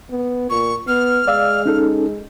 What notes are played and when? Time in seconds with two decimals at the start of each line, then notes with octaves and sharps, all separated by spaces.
0.11 B3
0.50 A#2 C#6
0.88 B3 F6
1.28 G#3 D5 F5 E6
1.66 C#4 D#4 A4